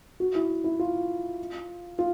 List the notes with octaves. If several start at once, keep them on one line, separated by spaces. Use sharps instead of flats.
F#4
E4
E4
F4
F4